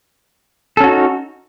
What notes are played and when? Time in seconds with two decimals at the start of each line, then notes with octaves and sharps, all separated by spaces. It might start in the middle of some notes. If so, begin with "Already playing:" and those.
0.77 A4
0.80 C#4
0.84 F#4
0.87 D#4